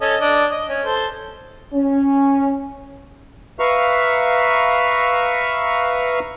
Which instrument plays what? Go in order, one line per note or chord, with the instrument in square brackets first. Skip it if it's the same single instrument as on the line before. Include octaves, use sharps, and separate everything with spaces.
[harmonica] C#4 A4 D#5
D4 D#5
D#5
C#4
A4 C5
[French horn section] C#4
[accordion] B4 E5 F5 A#5 C#6